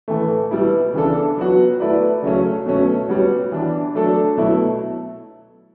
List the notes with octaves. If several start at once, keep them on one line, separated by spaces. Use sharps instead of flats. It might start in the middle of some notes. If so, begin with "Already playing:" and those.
A2 E3 A3
B2 G3 B3 E4
C#3 E3 B3 D4 A4
F#3 B3 F#4
A3 E4 B4 D5
C#3 F#3 A3 C#4
B2 F#3 A3 C#4
G3 B3 F#4 C#5
E3 B3 D4
F#3 A3 D4 A4
B2 F#3 A3 E4